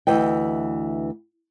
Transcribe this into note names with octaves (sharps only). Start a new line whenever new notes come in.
D2 E3 D#5 G5